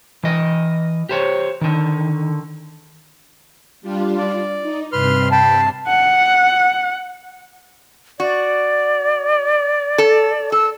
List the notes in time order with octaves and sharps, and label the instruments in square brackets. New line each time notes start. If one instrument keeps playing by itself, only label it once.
[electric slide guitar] E3 D#5
G4 C5 C#5
D3 D#3
[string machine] G3 D4 F4
[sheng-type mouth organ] D5
[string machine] D#4
[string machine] G2 C3 C7 [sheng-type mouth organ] B4 C6 F6
[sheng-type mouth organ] G5 B5 [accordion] A5
[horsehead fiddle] F#5
[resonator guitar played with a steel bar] F#4 [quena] D5
[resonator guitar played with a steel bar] A4
[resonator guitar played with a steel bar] A4 [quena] E6